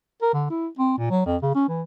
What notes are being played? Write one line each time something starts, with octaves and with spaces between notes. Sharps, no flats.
A#4
D3
E4
C4
A#2
F#3
F2
C#3
C#4
E3